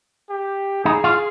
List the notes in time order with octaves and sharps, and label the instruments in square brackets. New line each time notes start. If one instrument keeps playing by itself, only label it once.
[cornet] G4
[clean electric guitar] D#4 [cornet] G#4
[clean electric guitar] F4